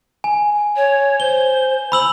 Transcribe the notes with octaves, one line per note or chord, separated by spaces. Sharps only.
G#5
C#5
C5 G7
B5 E6 F#7